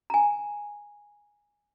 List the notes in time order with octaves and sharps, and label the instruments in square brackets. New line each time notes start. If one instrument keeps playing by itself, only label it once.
[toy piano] G#5 A#5